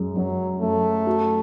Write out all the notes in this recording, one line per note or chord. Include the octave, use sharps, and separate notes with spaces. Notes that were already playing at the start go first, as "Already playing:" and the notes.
Already playing: F#2 G#3
F#2 F#3
F#2 A3
F#4